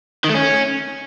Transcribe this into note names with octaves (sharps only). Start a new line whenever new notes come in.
D#3
A3
C#4